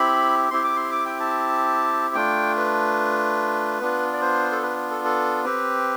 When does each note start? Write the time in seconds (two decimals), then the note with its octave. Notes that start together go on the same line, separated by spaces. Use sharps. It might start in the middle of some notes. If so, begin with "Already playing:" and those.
Already playing: C4 E4 G4 B5
0.51 C4 E4 G4 C6
0.64 D6
0.76 C6
0.92 D6
1.06 G5
1.20 A5
2.15 A3 D4 F4 G5
2.57 B4
3.81 B3 D4 F4
4.13 D5
4.21 C5
4.52 A4
4.63 B4
4.91 A4
5.04 A4
5.44 C4 G4 B4